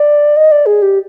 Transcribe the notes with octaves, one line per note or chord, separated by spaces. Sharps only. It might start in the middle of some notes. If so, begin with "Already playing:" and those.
Already playing: D5
D#5
D5
G#4
G4